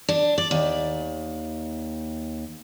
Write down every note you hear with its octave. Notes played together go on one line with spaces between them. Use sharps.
D4
D5
D#2